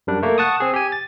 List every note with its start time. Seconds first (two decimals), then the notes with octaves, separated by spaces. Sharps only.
0.07 F#2 G3 D4
0.23 A3 A#3
0.38 F#5 A5 C#6 D#6
0.60 C4 G#4
0.74 G4 G#5
0.92 A6